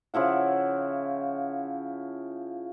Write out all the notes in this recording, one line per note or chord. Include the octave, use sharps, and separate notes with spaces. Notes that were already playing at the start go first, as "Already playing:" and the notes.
C#3 F3 E4 F#5